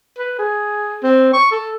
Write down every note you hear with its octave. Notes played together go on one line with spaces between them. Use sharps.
B4
G#4
C4
C#6
A4